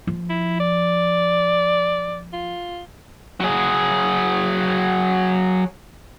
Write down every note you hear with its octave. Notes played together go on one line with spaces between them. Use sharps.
F3
E4
D5
F4
F#3 G#4